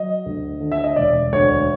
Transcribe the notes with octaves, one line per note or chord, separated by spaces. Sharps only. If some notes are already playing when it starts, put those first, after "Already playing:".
Already playing: F#3 D#5
D2
D3
E5
D#5
E1 D5
D2 C#5